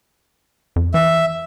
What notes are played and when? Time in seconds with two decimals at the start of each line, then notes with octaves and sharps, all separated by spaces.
0.76 F2
0.94 E3 E5